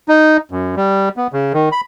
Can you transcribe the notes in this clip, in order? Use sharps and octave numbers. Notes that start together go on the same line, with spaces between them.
D#4
F#2
G3
B3
C#3
D#3
B5